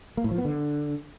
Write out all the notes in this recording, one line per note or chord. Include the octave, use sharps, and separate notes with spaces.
A#3
A2
F3
B3
D3